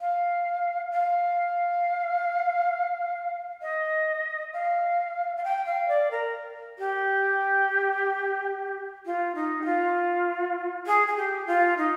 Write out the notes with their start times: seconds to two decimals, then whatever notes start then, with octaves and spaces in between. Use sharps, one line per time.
0.01 F5
0.91 F5
3.62 D#5
4.54 F5
5.37 F5
5.44 G5
5.66 F5
5.89 D5
6.11 A#4
6.79 G4
9.06 F4
9.35 D#4
9.62 G4
9.65 F4
10.87 G#4
11.07 G#4
11.17 G4
11.47 F4
11.77 D#4